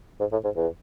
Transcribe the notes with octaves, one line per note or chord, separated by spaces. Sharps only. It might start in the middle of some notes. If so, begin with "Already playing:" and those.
G#2
A2
G#2
E2